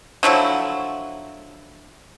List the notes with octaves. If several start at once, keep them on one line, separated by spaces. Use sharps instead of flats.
D3 F3 F#3 E4